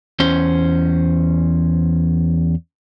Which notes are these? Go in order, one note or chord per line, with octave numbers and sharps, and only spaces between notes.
E2 C#4 C5